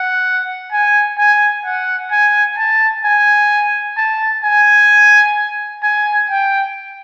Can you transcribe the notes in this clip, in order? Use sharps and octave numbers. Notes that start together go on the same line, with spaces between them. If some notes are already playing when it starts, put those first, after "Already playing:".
Already playing: F#5
G#5
G#5
F#5
G#5
A5
G#5
A5
G#5
G#5
G5